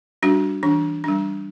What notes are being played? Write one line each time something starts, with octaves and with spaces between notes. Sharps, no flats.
G3 D4 F#4
E3 D4
G3 D4